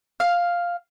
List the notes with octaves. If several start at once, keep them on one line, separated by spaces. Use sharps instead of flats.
F5 F6